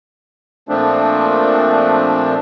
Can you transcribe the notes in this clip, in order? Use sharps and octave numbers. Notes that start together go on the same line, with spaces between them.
A#2 F3 A3 C4 D4